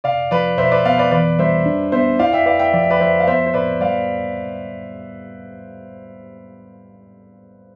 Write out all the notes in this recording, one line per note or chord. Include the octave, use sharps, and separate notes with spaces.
C3 D5 F5
F3 B4 D5
B2 C5 E5
B4 D5
B3 D5 F5
B4 D5
E3 B4 D5
G3 C5 E5
D4
B3 C5 E5
E4 D5 F5
E5 G5
B4 D5 F5
E5 G5
F3 D5
E5
B4 D5
F3 C5 E5
F5
B3 C5 E5
C5
A2 B4 D5
G3 D5 F5